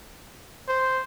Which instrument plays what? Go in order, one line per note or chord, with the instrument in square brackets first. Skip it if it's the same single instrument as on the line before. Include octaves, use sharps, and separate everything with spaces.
[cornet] C5